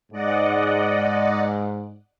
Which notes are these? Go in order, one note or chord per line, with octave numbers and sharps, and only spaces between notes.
G#2 D5 D#5 F#5